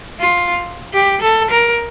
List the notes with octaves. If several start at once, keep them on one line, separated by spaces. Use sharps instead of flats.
F4
G4
A4
A#4